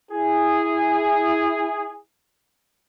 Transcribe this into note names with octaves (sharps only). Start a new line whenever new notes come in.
E4 G#4